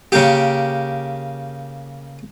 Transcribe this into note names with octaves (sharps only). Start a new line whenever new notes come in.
C#3 A#3 G4